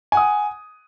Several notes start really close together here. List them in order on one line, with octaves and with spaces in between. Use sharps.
G#5 F#5 D#6